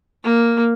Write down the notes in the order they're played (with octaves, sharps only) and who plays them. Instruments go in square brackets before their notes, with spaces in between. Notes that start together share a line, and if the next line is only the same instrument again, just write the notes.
[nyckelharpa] A#3